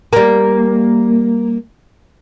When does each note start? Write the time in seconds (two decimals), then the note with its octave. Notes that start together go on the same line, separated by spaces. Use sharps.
0.13 G3 A#3